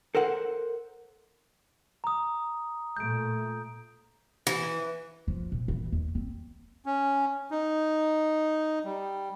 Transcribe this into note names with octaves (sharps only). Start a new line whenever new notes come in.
A4 A#4 C5 F#5
A#5 D#6
A#2 A3 G6 D7
E3
F3
A#2
E3
D#2
C4
C#4
D#4
G3